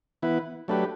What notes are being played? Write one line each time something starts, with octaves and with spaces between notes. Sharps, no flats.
E3 B3 E4 B4
F#3 A3 D4 G4 B4